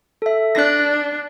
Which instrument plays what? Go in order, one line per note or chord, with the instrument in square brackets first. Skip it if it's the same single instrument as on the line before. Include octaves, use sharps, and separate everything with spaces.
[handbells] A4 E5
[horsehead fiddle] D4 [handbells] F#6 A#6